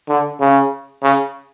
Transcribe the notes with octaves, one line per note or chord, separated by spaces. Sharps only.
D3
C#3
C#3